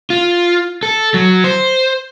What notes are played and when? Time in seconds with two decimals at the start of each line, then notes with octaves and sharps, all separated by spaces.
0.10 F4
0.83 A4
1.14 F#3
1.44 C5